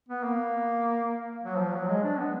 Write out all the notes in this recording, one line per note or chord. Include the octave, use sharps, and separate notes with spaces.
B3
A#3
F#3
F3
F#3
G#3
D4
B3